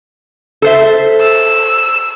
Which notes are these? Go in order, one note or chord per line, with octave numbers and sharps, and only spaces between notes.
A4 C5 E5
E6